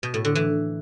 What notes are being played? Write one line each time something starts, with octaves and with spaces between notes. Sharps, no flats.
B2
A2
D3
E3